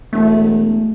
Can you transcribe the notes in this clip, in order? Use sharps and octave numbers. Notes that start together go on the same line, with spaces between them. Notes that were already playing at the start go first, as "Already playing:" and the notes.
E1 A3